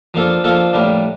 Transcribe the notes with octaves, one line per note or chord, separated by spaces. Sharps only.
F3 A#3 D4 F4 A4
F3 A#3 D4 F4 A4
A2 G3 A#3 D4